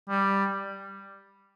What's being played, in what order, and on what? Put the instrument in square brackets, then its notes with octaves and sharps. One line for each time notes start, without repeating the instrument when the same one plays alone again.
[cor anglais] G3